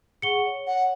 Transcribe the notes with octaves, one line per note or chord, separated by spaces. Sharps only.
G#4 F#5 C#6 C#7 G7
C#5
F#5